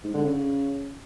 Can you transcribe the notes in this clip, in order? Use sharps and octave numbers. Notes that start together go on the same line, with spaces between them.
G#2
D3
C#3